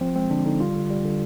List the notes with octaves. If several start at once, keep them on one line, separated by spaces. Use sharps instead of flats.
F3 C4
G#3 C4
D3 D4
D3 D#4
G3 F4
D3
G3
D3